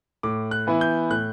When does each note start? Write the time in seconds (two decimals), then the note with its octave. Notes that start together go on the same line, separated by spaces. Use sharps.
0.23 A2 D6
0.51 F#6
0.67 E3 B3 E4
0.81 G6
1.10 A2 F#6